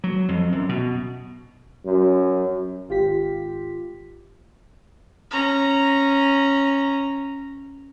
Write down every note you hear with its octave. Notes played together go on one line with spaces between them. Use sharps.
F#3
F2
F#2
B2
F#2
G#1 F4 G4 B6
C#4 A#5